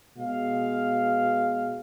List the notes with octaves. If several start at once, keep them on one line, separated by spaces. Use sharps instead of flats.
B2 G#3 F5